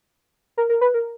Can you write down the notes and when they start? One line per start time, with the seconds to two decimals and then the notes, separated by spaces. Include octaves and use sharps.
0.57 A#4
0.69 A#4
0.81 B4
0.94 A#4